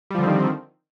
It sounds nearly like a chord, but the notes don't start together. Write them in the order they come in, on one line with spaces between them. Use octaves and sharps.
G3 F3 D3 C4 D#3